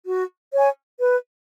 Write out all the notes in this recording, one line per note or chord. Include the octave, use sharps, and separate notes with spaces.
F#4
C#5 G#5
B4